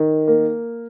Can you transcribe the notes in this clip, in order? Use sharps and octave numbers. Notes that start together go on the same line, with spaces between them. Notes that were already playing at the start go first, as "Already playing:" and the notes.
Already playing: D#3
A#3